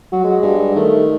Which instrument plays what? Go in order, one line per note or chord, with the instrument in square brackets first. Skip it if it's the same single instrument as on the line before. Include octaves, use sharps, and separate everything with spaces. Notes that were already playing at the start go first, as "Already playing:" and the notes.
[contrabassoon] F#3 [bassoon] F#4
[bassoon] G#3
[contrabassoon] G2
[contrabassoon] D#3 [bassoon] A3